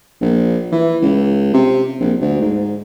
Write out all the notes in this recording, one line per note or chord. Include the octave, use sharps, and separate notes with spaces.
A#1
E3
C#2
C3
A#1
D2
G#2